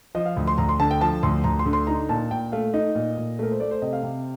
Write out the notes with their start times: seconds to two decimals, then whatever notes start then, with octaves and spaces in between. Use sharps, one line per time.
0.15 F3 D#5
0.26 F5
0.37 D2
0.47 C6
0.58 D2 A#5
0.69 C6
0.80 D3 A5
0.91 G5
1.01 F3 A5
1.23 D2 C6
1.44 D2 A#5
1.59 C6
1.66 D3
1.73 C6
1.87 D#4 A#5
2.09 A#2 A5
2.31 A#2 G5
2.52 A3 F5
2.74 D#4 D#5
2.95 A#2
3.17 A#2
3.39 A3 A#4
3.51 C5
3.60 A3 D5
3.71 C5
3.82 C3 D#5
3.93 F5
4.03 C3